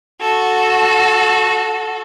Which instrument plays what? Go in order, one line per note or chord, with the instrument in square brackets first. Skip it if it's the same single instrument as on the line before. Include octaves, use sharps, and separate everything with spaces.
[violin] F#4 A4